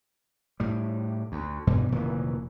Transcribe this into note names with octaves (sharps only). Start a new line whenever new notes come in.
A2 G3
D2
G2 B2 E3 G3
F1 A#2 D#3 E3